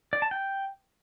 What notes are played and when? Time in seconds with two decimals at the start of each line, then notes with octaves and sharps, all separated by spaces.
0.13 D5
0.22 A5
0.31 G5